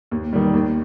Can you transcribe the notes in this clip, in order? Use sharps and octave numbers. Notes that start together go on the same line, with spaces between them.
D#2
D#3 G3
D#2